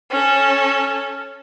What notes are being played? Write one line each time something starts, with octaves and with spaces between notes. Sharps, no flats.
C#4 A4